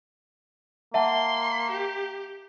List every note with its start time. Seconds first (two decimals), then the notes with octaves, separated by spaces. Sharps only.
0.94 A#3 E5 F#5 A5 C6
1.70 G4